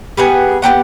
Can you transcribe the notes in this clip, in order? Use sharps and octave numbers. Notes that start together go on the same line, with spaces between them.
G3 B3 G#4
B3 E4 G4 F#5